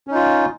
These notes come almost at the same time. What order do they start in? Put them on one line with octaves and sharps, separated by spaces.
C#4 D#4 F4